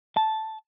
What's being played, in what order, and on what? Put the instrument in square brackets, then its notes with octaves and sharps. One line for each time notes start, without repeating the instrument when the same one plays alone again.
[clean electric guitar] A5